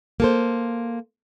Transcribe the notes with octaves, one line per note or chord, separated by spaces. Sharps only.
A#3 A4 C5